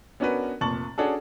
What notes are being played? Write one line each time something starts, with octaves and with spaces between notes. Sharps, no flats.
B3 C#4 D4 F#4 A#4 B4
F1 A#2 A5 C#6 A6 F#7
C#4 D4 F#4 G#4 A4